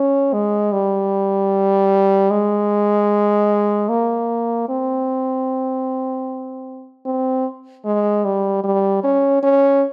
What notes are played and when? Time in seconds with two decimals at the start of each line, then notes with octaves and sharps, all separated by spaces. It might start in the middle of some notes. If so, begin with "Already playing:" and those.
Already playing: C#4
0.33 G#3
0.73 G3
2.31 G#3
3.89 A#3
4.69 C4
7.05 C4
7.85 G#3
8.25 G3
8.64 G3
9.03 C#4
9.43 C#4